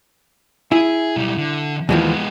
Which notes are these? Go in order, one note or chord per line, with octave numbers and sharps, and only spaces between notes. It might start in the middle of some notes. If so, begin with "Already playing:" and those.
E4 G#4
B1 G3
D3
D#2 E3 F3 G#3 B3